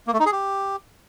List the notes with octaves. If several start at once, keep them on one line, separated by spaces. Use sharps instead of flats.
A#3
A3
D#4
G#4
G4